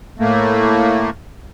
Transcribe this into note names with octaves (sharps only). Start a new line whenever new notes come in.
A2 A3 A#3